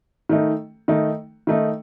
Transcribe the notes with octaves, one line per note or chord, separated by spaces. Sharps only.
D#3 A3 D#4
D#3 A3 D#4
D#3 A3 D#4